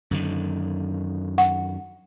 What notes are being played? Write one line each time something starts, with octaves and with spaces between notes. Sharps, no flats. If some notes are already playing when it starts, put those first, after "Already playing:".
F#2 D3 D#3
F#5